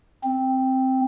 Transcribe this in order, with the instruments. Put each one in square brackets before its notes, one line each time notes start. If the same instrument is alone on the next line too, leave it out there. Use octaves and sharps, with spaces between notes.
[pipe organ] C4